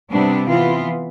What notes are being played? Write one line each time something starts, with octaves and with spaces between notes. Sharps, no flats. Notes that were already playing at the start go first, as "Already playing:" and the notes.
C3 G3 B3 D4
E3 B3 F4